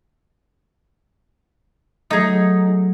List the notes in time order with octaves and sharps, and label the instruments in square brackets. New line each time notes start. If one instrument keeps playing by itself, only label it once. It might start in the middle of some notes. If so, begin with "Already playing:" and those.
[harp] F#3 A3 [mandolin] D#4 G#4